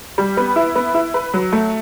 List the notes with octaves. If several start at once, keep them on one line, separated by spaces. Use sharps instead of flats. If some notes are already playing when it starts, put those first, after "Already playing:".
G3
B3
E4
B3
E4
B4
F#3
A3